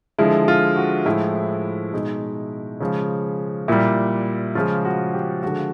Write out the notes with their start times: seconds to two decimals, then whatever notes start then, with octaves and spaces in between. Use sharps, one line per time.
0.18 D3 F3 G#3 E4
0.48 F4
0.76 F#4
1.05 A2 F3 G#3 E4
1.93 B2 G#3 D#4
2.80 C#3 F3 G#3
3.68 A#2 G3 E4
4.55 C#3 F3 G#3 F4
4.85 F#4
5.14 G4
5.42 D3 F3 G#3 F#4